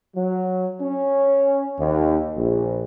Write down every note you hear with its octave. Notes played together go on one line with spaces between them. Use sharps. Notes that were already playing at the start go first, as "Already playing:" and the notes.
F#3
C#4
D#2
A#1